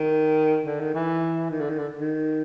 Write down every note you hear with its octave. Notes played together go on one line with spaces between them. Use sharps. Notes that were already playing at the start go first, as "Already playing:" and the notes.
Already playing: D#3
D3
D#3
E3
D#3
D3
D#3
D3
D#3